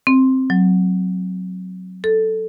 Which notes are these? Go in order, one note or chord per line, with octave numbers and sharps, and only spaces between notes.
C4
F#3
A4